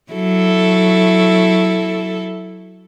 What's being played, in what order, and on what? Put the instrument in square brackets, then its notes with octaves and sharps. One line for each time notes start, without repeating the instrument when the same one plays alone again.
[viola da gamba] F#3 E4 A4